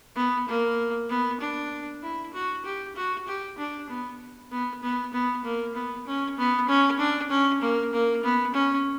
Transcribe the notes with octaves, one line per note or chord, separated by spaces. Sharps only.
B3
A#3
B3
D4
E4
F#4
G4
F#4
G4
D4
B3
B3
B3
B3
A#3
B3
C#4
B3
C#4
D4
C#4
A#3
A#3
B3
C#4